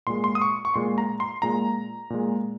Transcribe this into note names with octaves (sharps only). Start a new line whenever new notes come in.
A#2 G#3 C6
C6
D#6
C#6
C#6
A#2 G#3 C6
A#5
C6
A#2 G#3 A#5
A#2 G#3